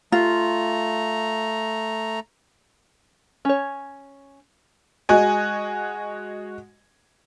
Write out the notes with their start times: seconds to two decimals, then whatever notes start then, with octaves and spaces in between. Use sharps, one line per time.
0.12 A3 F4 A#5
3.45 C#4 C#5
5.09 G#3 F#4 D#5 G#5